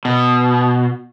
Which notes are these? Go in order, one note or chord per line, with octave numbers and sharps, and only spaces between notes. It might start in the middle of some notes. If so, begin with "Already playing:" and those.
B2